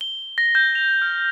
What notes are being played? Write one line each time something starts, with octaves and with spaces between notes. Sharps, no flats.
G7
A#6
G6
F7
F6